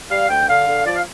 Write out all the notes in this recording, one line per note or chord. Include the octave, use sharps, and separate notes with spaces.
G3 F5
D2 G5
D3 F5
D3
F3 D5
F5